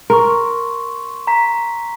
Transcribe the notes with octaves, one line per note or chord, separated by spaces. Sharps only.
A#4 C6 C#6
A#5 B6